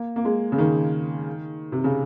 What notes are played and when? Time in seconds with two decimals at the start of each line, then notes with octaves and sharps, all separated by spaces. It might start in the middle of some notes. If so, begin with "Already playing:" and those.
Already playing: A#3
0.16 A#3
0.25 G#3
0.52 C#3
0.58 D#3
1.72 C3
1.84 C#3